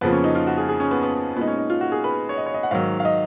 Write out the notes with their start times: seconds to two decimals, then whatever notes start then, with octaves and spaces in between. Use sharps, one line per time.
0.01 F2 C#3 F3 A#3 B3
0.12 C#4
0.24 D#4
0.35 F4
0.47 F#4
0.57 G#4
0.69 G#4
0.80 C#4
0.91 B3
1.03 B3
1.37 A#2 G#3 B3 D#4
1.47 C#4
1.58 D#4
1.70 F4
1.81 F#4
1.92 G#4
2.04 B4
2.29 C#5
2.37 D#5
2.46 C#5
2.54 D#5
2.63 F#5
2.71 G#2 D#3 F#3 F5
3.00 F5
3.05 D#5